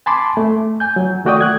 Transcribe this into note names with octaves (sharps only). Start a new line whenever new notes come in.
G#5 A5 B5 C6 D6
A3
G#5 G6
F#3
D#3 A3 F#4 D5 G5 D#6
A3 F#6 G#6